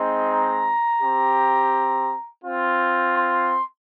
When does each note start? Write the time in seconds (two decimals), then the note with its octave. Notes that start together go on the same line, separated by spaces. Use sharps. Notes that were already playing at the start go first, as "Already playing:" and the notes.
Already playing: G#3 C4 D#4
0.30 A#5
1.01 C4 G4
2.44 C4 F4
3.14 C6